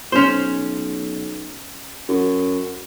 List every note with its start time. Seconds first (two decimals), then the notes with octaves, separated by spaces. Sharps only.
0.12 B1 C#4 C5
2.09 F#2